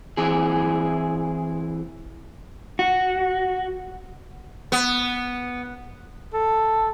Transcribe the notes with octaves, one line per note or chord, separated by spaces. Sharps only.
E3 C4 E4 G#4
F#4
B3
A4